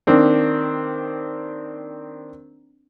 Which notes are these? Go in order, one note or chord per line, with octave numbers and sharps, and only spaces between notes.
D#3 A#3 C4 D4